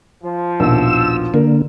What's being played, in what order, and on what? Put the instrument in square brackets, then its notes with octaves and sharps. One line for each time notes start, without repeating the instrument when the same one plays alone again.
[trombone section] F3
[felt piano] A#1 D#2 B2 [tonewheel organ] E6
[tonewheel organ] D3 A#3 [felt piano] A#4